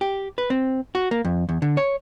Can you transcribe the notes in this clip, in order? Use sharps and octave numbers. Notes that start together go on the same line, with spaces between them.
G4
B4
C4
F#4
A#3
F2
E2
D3
C#5